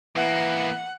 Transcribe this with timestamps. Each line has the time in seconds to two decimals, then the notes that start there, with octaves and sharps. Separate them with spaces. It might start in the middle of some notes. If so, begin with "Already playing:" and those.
0.16 E3 A#3 B3 F#5